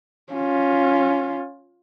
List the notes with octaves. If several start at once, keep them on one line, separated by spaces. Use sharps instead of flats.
C#4 F4